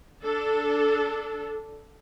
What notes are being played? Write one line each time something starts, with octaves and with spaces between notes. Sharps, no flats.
D4 A4